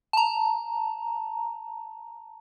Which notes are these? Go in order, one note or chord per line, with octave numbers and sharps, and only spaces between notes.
A5 A#5